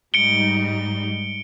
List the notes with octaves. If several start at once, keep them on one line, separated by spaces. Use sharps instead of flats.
G#2 G3 D#4 C#7 D7 G7